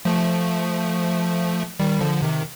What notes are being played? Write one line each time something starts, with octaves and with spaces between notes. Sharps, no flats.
F3 A3
D#3 G3
D3 F3
C3 D#3